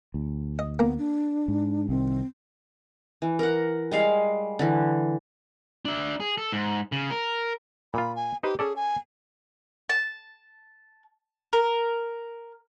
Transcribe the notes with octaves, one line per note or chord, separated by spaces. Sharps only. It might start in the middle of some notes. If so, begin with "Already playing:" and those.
D2
D#5
A#3 B3 A#5
D4
G#2
C2 C3 D#3 C4
E3
A#4 F#5
G3 G#3 F5
D3 E3
D4 E5
G#4
A4
G#2
C#3
A#4
A#2 F4 B5
G#5
D#4 G4 B4 C5
C#4 G#4 A4 D5
G#5
A5
A#4